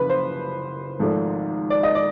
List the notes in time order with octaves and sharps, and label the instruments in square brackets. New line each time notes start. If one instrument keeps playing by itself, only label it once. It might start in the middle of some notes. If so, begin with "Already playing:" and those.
Already playing: [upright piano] F#1 C#3 F3 B4
C5
G#1 G#2 F3 A3
D5
D#5
D5